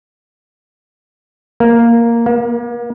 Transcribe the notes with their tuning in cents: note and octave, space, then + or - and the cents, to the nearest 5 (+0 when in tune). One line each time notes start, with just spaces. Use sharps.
A#3 +0
A#3 +40